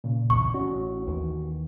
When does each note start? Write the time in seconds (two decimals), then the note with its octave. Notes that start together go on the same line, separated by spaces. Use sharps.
0.04 A#2 C#3
0.30 B1 E2 C#6
0.54 A1 C#4 F#4
1.07 D#2 D#3 E3